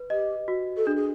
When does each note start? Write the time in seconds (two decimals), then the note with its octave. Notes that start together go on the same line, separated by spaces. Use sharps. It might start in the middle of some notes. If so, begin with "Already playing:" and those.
Already playing: B4
0.10 G4 D#5
0.48 F#4
0.77 A4
0.86 D4 G#4
0.96 G#4